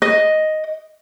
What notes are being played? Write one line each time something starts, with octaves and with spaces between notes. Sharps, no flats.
D#5